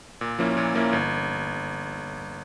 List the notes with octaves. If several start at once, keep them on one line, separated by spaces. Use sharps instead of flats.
A#2
F3 A#3 C#4 E4
A#2
F3 A#3 C#4 E4
G1